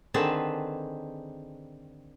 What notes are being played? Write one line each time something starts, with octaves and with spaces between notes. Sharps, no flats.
D3 D#3 C4 G#4 B4 A5